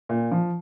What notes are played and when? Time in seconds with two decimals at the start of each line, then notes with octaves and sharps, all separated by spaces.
0.09 A#2
0.31 F3